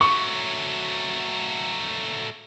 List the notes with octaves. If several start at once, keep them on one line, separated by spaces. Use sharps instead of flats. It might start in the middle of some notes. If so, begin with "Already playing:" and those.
F#3 A3 C#6